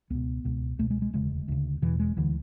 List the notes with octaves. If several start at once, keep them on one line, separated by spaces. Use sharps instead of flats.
C#2 B2 B3
C#2 B2
C#2 B2 A3
G#3
G#3
E1 D2 C#3 G#3
D2 C#3
E1 E2 B2 E3
G#3
D2 D3 E3